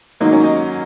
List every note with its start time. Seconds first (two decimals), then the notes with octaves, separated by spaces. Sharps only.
0.20 G#2 D#3 F#3 A#3 D#4
0.32 C#4
0.43 D#4